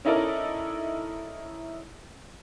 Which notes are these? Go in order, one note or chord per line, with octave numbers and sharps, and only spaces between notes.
C#4 D#4 E4 A4 A#4 D5